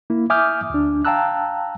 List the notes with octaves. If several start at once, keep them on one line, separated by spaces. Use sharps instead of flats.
A#3 E4
E5 G#5 D6 D#6 F6 G6
D2 D4
F5 G5 A5 A#5 E6 F#6